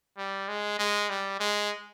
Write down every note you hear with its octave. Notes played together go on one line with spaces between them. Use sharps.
G3
G#3
G#3
G3
G#3